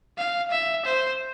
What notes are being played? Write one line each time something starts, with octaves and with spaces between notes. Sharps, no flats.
F5
E5
C5